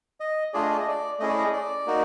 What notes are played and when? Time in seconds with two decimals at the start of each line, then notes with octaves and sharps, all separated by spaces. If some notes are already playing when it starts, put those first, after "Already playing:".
0.20 D#5
0.54 A3 D4 F4 G#4 D5
0.62 D#5
0.71 D5
0.79 D#5
0.88 D5
1.19 A3 C#4 E4 G#4 D#5
1.29 D5
1.38 D#5
1.53 D5
1.87 A#3 D#4 F#4